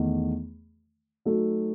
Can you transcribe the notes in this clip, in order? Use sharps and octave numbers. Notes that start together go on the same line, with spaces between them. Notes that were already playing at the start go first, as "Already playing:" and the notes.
Already playing: E2 D#3 A3 D#4
F#3 A3 D#4 A4